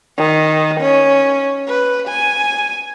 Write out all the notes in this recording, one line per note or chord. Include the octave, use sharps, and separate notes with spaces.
D#3
C#4
B4
G#5